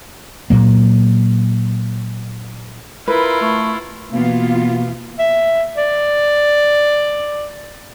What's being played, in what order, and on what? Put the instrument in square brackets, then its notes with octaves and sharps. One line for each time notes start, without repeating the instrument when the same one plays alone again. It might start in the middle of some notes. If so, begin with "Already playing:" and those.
[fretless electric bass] A#2 F#3 A#3
[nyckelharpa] E4 F4 [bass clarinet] A#4 [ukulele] B4
[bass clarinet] A3
[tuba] B2 [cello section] E3 B3 F4 [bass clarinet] A#3
[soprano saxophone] E5
D5